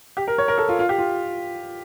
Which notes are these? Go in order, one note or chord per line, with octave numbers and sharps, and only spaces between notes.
G4
A#4
C#5
A#4
A4
F4
F4
G4
F4